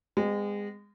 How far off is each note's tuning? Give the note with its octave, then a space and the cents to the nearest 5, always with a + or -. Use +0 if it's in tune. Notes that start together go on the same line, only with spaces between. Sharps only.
G#3 -25 B3 +45